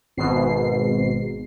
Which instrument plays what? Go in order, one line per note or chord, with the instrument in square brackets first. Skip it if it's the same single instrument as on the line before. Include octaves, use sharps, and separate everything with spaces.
[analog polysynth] G#1 G#2 B2 C7